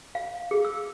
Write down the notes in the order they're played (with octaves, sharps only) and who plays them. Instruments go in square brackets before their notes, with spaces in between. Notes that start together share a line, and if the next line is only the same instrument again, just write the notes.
[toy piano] F5
G#4
E6